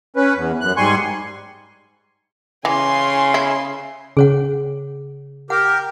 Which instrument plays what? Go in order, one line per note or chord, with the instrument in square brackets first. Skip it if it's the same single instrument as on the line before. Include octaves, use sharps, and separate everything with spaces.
[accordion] C#4 B4
E2
F#2 F#6
G#2 G3 G#5 C6 C#6
[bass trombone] C#3 [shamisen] E3 [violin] G#5 C6
[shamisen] E4
[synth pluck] C#3 [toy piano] G#4 C#5 F#5
[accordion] G4 A#4 [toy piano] F#5